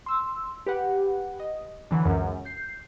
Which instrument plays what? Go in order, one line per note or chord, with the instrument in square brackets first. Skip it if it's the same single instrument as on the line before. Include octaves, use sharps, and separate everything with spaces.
[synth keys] C6 E6
G4 B4 F#5
D#5
D3 E3 F#3
C#2 F#2
G6 C7